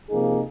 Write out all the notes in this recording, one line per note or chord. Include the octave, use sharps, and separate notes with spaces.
C3 F3 A#3 D#4 G#4